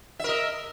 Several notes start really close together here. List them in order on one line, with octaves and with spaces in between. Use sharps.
E5 A#4 D#5